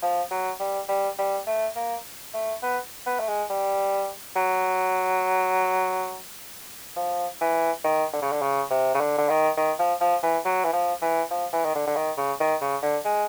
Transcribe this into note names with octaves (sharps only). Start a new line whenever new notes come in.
F3
F#3
G3
G3
G3
A3
A#3
A3
B3
B3
A3
G#3
G3
F#3
F3
E3
D#3
D3
C#3
D3
C#3
C3
C#3
D3
D3
D#3
D#3
F3
F3
E3
F#3
E3
F3
E3
F3
E3
D#3
D3
D3
D#3
C#3
D#3
C#3
D3
G#3